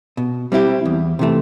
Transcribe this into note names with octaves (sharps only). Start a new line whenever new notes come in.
B2
G3 C4 E4 G4
E2
C3 E3 A3